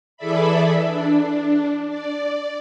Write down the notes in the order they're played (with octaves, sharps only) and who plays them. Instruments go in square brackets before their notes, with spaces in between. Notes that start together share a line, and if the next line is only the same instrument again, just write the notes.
[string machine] E3 G#4 A4 D5 E5 B5
D4
D5